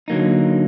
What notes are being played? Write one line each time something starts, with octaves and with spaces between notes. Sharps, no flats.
D3 F#3 A#3 D#4